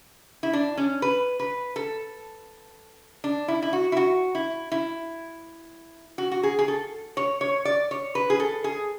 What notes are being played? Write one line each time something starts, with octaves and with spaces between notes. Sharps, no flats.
E4
D4
C#4
B4
B4
A4
D4
E4
E4
F#4
E4
F#4
E4
E4
F#4
F#4
G#4
G#4
A4
C#5
C#5
D5
C#5
B4
G#4
A4
G#4